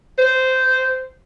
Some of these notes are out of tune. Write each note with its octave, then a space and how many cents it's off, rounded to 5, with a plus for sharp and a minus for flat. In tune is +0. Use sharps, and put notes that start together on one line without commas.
C5 -15